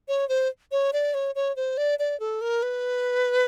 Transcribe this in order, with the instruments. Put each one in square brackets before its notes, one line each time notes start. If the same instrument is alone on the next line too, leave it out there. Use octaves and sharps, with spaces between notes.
[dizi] C#5
C5
C#5
D5
C#5
C#5
C5
D5
D5
A4
A#4
B4